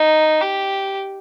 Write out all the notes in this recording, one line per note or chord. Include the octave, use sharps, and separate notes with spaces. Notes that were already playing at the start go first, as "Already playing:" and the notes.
Already playing: D#4
G4